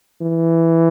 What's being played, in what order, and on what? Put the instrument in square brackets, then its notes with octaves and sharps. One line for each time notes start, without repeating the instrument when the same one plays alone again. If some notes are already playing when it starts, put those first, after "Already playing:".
[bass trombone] E3